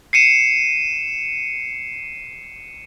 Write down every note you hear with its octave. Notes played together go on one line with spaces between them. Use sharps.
C7 C#7 D#7 E7